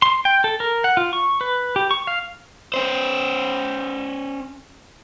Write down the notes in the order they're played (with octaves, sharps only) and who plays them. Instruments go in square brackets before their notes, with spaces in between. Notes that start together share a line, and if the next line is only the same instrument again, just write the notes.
[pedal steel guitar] C6
G5
A4
A#4
F#5
F4
C#6
B4
G4
C#6
F5
[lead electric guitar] C#4 C5